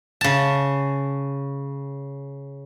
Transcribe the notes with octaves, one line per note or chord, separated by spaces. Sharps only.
C#3 A5